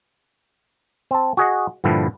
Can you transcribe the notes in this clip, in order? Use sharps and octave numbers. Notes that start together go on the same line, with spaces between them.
C4 A5
F#4 G#4 D#5 F#5
G2 A#2 D3 F3 G3 E4